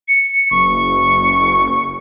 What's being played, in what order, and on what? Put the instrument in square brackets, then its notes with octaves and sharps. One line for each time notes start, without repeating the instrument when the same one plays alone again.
[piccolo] C#7
[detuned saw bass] F#1 [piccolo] C#6